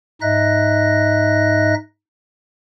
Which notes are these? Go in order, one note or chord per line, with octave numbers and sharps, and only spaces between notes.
G#2 D#4 D#5 E5 F#6 A#6